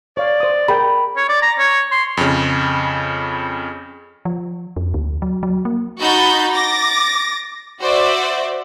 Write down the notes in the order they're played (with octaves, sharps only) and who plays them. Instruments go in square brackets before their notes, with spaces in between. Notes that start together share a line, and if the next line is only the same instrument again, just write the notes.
[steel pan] C#5 F5 [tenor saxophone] D5
[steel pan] C5 D#6
[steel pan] G#4 A#4 G5 [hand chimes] B5
[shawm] C#5
D5
A#5
C#5
C6
[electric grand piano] F2 C#3
[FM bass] F3
F2
D2
F#3
F#3
A#3
[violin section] D#4 F#4 B5 G6 A6
D6 A6 A#6
F#4 C5 D5 E5